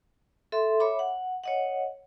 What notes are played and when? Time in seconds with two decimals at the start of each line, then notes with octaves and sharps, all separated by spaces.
0.52 A4 E5 C6
0.80 C#5 E5 B5 D6
0.99 F#5
1.43 C#5 D#5 F#5